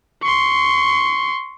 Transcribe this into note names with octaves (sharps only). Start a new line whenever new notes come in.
C6 C#6